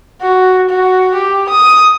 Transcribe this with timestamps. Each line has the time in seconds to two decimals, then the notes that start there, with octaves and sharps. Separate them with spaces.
0.22 F#4
0.70 F#4
1.15 G4
1.49 D#6